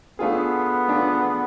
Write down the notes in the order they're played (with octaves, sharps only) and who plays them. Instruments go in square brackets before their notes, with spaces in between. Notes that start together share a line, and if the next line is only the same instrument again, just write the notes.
[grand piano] A3 D4 F4 G#4 [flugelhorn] B3
[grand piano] A3 D4 F4 G#4